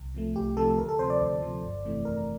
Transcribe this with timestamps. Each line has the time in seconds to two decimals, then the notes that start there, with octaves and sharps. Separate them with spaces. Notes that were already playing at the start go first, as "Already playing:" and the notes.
Already playing: C2
0.15 C3 F3 A3
0.36 C2 G4
0.57 C3 F3 A3 A4
0.78 D2 A#4
0.89 A4
0.99 C3 F3 C5
1.10 D5
1.21 D2
1.42 C3 F3
1.63 G1
1.84 F2 C3 E3 A3
2.05 G1 A#4